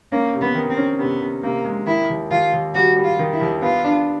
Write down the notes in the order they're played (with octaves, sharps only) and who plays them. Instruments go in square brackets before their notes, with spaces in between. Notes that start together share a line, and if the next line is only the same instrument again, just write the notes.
[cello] A#3 [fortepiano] C#4
[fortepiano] C3
[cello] B3
[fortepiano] D#3
[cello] C4
[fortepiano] C#4
[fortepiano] C3 [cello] B3
[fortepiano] C3
[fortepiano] C3 [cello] A#3
[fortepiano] G#3
[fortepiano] D#3 [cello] E4
[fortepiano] D#2
[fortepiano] D#2 [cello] F4
[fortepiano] D#2
[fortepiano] G3 [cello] F#4
[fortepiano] G3
[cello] F4
[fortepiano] D#3
[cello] E4
[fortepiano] D#2
[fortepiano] B3 [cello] F4
[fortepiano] D4